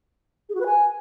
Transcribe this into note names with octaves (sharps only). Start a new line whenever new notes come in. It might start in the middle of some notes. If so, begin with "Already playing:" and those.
G#4
F#4
B4
G#5